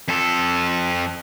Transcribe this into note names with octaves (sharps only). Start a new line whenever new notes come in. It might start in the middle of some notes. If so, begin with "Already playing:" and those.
F2 A4